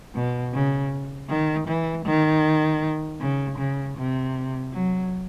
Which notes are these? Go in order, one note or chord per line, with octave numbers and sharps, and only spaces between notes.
B2
C#3
D#3
E3
D#3
C#3
C#3
C3
F#3